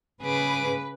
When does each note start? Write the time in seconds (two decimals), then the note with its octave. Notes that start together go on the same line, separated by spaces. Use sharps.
0.22 C#3 G#4 B4 D6